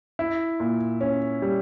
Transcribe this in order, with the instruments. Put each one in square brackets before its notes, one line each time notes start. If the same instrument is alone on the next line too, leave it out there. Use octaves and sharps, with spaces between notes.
[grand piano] E4
A#2
C#4
G3